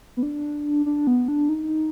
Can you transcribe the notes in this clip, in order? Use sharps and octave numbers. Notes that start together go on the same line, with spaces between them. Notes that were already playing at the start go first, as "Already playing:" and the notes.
B3
D4
D4
B3
D4
D#4